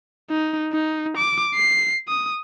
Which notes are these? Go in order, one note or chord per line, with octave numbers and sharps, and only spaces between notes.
D#4
D#4
D6
C7
D#6